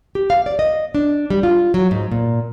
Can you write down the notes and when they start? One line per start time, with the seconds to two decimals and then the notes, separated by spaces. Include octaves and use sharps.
0.15 G4
0.30 F5
0.46 D5
0.59 D#5
0.95 D4
1.30 G3
1.43 F4
1.74 F#3
1.91 G#2
2.12 A#2